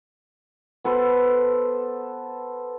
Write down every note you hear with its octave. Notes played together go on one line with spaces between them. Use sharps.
B3 A4 B4 C5